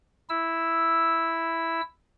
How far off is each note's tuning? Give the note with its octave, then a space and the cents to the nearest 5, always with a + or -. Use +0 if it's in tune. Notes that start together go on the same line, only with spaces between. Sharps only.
E4 +0 E6 +0